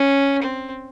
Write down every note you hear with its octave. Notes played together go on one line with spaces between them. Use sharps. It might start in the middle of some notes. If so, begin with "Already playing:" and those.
Already playing: C#4
C4